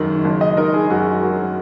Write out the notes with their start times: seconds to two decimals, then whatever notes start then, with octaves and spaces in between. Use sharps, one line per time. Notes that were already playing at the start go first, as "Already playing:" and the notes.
Already playing: F#1 F#2 D#3
0.25 F#1
0.41 D#5
0.57 D#4 A#4
0.74 G#4
0.90 F#2 F#4
1.23 F#3